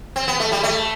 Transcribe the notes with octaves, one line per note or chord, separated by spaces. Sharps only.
C4
B3
A3
G3
A3